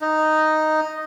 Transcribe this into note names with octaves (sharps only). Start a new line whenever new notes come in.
D#4